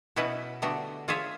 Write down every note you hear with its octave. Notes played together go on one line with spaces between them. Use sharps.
B2 B3 C#4 E4 F#4 B4
D3 G3 A3 B3 F#4 G4
F4 G#4 C#5 E5